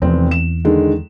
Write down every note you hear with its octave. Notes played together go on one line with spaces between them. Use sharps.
F1 E2 C4
E7
D3 D#3 G#3